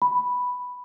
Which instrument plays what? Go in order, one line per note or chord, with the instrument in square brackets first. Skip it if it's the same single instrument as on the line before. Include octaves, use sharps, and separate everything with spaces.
[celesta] B5